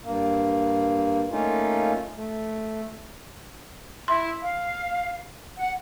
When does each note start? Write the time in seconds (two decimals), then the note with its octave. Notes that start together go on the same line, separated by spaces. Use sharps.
0.04 G2 A#3
1.31 A3 A#3 C#4 D#4 F4
2.16 A3
4.08 E4 C6
4.42 F5
5.57 F#5